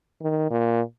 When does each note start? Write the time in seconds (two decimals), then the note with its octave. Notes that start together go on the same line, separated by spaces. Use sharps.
0.22 D#3
0.51 A#2